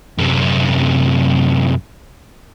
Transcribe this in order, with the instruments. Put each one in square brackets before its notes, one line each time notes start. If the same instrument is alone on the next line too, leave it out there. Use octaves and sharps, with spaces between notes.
[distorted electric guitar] F#2 C3